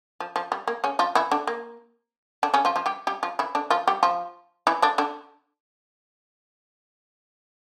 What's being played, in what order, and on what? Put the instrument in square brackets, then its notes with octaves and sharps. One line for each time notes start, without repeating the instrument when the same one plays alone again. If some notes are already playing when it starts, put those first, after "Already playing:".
[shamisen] F3
F3
G3
A#3
C#3 C#4
F3 F4
E3 E4
D3 D4
A#3
D3 D4
C#3 C#4
F3 F4
F3 F4
G3 G4
G3 G4
F3 F4
E3 E4
D3 D4
F3 F4
G3 G4
F3 F4
E3 E4
D3 D4
D3 D4